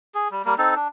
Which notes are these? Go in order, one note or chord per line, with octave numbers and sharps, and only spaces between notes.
G#4
G3
G3 A#3
C4 D#4 A4
D4